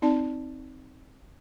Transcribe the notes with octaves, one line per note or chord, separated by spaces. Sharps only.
C4 D#4 D5 A5